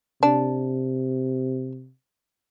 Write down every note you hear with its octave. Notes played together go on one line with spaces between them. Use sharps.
C3 D4